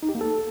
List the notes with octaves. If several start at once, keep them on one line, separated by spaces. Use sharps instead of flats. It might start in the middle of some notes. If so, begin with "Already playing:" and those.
D#4
G4
A#3
A4